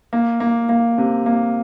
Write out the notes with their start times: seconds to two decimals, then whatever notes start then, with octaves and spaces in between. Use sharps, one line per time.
0.13 A#3
0.40 A#3
0.69 A#3
0.98 C3
1.26 A#3